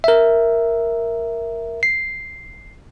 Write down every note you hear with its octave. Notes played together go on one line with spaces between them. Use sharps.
A#4 E5
C7